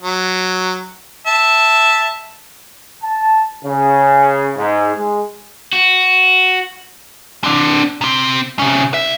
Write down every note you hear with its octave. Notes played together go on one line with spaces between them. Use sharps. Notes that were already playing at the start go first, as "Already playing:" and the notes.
F#3
E5 A5
A5
C#3
G#2
G#3
F#4
C4 D4
C3 C4
C3 C#4
C2 E5